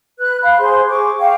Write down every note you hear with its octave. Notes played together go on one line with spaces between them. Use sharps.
B4 F#6
F5 B5
G#4 C5 C6
G#4 C#6 D6
F5 G5